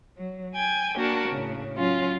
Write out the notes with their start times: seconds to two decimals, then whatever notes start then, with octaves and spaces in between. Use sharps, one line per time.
0.17 F#3
0.55 G5 G#5 G#6
0.96 A#3 D4 F#4 A#4 A5
1.28 A2 C#3
1.77 F#3 C#4 F4